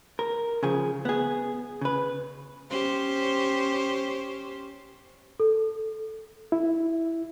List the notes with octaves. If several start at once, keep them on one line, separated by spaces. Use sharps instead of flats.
A#4
C#3 F3 G#4
B3 G#4
C#3 B4
C#4 G4 C5
A4
E4